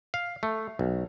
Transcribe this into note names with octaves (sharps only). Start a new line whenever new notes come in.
F5
A3
B1